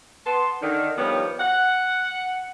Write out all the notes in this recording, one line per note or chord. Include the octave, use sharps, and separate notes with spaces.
B3 A5 C6
D3 D#3
G2 D#3 F3 G3 B3 C#5
F#5